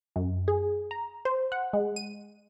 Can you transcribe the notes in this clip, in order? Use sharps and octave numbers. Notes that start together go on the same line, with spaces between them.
F#2
G#4
A#5
C5
F#5
G#3
D#7